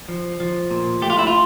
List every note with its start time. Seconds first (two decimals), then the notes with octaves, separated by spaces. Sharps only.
0.09 F3
0.40 F3
0.71 A#2
1.02 A3 G4
1.10 F4
1.18 E4
1.27 F4